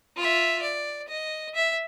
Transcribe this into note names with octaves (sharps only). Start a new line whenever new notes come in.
F4 E5
D5
D#5
E5